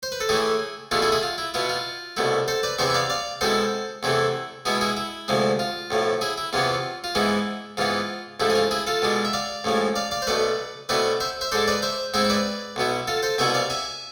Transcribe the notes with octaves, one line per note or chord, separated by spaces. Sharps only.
C5
B4
A4
A2 E3 A3 E4 G#4
E2 B2 A3 E4 F4
E4 G#4
E4 G#4
F4
E4
B2 B3 E4 F4
F4
C2 B2 A3 E4
A4 C5
B4 D5
E2 C3 E3 B3 C5 E5
E5
D5 F5
D5 F5
B2 G#3 C4 E4 A4 C5
E2 C3 E3 A3 E4
B2 G#3 B3 E4 G#4
E4 G#4
E4
D2 C3 F3 G#3
F4
B1 A2 F3
E4 G#4
E4
E2 C3 E3 B3 F4
F4
G#2 E3 G#3 B3 E4
G#2 E3 B3 F4
A1 G#2 F3 A3 E4
G#4
F4
E4 G#4
F4 A4
B2 G#3 D4
E5
D5 F5
A1 A2 F3 G#3
D5 F5
D5 F5
C5
B1 B2 A3 B4 D5
B2 A3 C4 E4 B4 D5
C5 E5
C5 E5
G#2 G#3 D4 A4 C5
B4 D5
C5 E5
G#2 G#3 C4 E4 C5 E5
E5
B4 D5
B1 B2 B3 E4
F4 A4
A4 C5
C2 B2 B3 E4 E5 G#5
D5 F5
E5 G#5